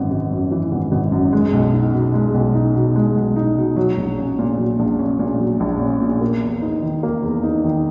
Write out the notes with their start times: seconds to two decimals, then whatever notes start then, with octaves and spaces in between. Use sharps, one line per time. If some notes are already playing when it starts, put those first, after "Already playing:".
Already playing: G#1 F#2 E3
0.11 G#1
0.31 F#2
0.51 E3
0.72 G#1
0.92 G#1
1.12 F#2
1.33 G#3
1.53 B1
1.73 D#4
1.93 B2
2.14 G#3
2.34 B1
2.55 D#4
2.75 B2
2.96 G#3
3.16 B1
3.36 D#4
3.57 B2
3.77 F#3
3.98 A#1
4.18 C#4
4.39 A#2
4.59 F#3
4.79 A#1
4.99 C#4
5.19 A#2
5.40 F#3
5.60 A#1
5.80 C#4
6.01 A#2
6.21 A#3
6.42 E2
6.62 D#4
6.83 D#3
7.03 A#3
7.23 E2
7.43 D#4
7.64 D#3